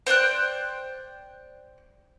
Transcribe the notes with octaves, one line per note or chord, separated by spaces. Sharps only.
C5 D5 G5 F#6